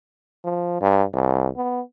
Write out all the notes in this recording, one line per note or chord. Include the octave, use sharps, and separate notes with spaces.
F3
G2
C2
B3